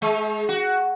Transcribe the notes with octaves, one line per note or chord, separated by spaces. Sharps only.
G#3
F#4